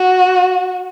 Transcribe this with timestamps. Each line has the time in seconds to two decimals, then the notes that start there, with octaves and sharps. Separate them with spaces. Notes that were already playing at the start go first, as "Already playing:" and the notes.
Already playing: F#4